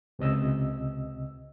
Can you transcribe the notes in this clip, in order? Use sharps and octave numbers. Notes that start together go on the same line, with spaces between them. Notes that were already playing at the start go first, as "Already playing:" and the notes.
C#2 C3 D#5 E6